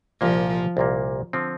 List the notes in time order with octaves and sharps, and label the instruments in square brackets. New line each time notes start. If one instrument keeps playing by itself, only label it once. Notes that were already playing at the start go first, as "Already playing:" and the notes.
[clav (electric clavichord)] C2 A#2 A#3 [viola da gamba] F3
[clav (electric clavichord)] C2 A#2 A#3
D3 F3 C4